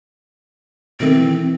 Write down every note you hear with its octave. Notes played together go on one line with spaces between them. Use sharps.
B2 D#3 A3 C4
E3